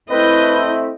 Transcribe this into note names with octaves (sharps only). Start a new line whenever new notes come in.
A3 C4 E4 B4 D#5 G6